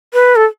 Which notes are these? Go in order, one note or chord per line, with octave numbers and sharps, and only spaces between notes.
B4
A4